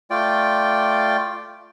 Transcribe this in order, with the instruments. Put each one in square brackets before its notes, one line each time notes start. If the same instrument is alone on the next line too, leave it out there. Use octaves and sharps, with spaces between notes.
[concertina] A3 F4 D5 G5